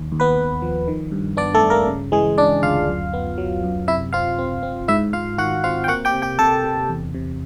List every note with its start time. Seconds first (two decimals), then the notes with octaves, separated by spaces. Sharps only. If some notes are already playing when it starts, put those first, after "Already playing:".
Already playing: D#2
0.12 D#2
0.20 B3 B4
0.36 D#2
0.62 F3
0.88 D#3
1.12 G2
1.37 B3 D4 D5
1.54 A3 A4
1.62 G2
1.70 A#3 A#4
1.87 C#3
2.12 E3 G#3 G#4
2.38 C#3 D4 D5
2.63 D2 F4 F5
2.88 F#2
3.13 B3
3.38 F#3
3.64 F#2
3.87 C3 E4 E5
4.13 C4 F4 F5
4.38 C4
4.63 C4
4.88 G#2 E4 E5
5.13 G#2 F4 F5
5.38 D#3 F#4 F#5
5.64 C4 F4 F5
5.84 G5
5.88 A#3 F#4 F#5
6.05 G4 G5
6.14 C3
6.22 G4 G5
6.39 C3 A4 A5
6.64 C3
6.89 E2
7.14 C3